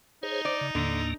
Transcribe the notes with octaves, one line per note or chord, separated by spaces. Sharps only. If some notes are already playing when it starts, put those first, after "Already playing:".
D#4 G#4 C5 C#5
C5 D5
C#3
D#2 A2 D3 A#3